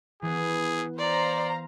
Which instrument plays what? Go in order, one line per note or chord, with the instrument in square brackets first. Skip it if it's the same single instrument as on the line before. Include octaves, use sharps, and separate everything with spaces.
[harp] E3 B3 [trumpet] G#4
[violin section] C5 F5 A#5 [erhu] D5 [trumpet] C6